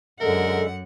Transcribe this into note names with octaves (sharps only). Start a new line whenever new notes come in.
F#2 D3 G#3 A4 A#4 E5 F#5